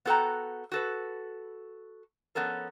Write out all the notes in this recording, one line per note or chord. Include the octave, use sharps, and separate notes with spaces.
B3 F#4 A4 A#4 G5 A#5
F#4 A4 B4
F3 B3 C#4 A4 A#4